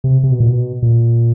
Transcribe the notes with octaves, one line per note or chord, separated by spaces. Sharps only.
C3
C3
B2
A#2
B2
A#2